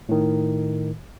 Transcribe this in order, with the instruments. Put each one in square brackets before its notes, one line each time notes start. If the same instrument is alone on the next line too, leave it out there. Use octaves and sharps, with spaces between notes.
[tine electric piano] A2 D#3